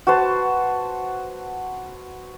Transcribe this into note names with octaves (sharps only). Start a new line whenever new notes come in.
F#4 B4 C5 A5